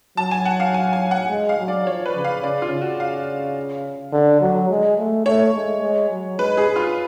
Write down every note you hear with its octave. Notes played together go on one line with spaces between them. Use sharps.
F#3 A5
G#5
F#5
F5
G#5
G#5
F#5
G#3
F5
F#3
D5
F3 C#5
B4
C#3
F5
C#3 D5
F4
C#3
F#4
F5
D3
F#3
G#3
A3
A3 C#5
G#3
G#3
F#3
G#3 B4
G#4
F4